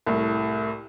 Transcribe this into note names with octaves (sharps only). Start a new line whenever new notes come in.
C2 A2